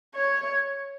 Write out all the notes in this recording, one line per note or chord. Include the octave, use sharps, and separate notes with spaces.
C#5